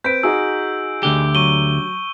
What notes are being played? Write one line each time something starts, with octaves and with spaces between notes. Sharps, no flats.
C4 B4 G6 B6 D7
D#4 F#4 G#4 E6
D2 D3 G4
F#3 C#6 D#7 G7